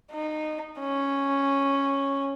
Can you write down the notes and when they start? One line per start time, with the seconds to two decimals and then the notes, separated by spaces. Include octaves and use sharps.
0.12 D#4
0.80 C#4